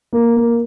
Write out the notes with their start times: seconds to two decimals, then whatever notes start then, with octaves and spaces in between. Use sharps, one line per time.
0.13 A#3
0.36 A#3